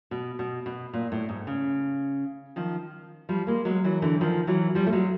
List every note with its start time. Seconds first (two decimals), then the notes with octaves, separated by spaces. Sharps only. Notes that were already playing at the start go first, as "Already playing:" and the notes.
0.11 B2
0.39 B2
0.66 B2
0.93 A#2
1.12 A2
1.29 G#2
1.47 C#3
2.56 D#3 F3
3.29 F3 G3
3.47 G#3 A#3
3.65 F#3 G#3
3.84 E3 F#3
4.02 D3 E3
4.21 D#3 F3
4.47 E3 F#3
4.75 F3 G3
4.86 A3
4.93 F#3 G#3